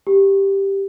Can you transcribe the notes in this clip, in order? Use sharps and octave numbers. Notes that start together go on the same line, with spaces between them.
G4